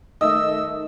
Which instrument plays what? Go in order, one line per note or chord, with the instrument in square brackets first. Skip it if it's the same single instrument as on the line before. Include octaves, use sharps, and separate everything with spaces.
[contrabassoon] D#3 [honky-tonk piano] A3 D#5 [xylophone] D#6 [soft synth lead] E6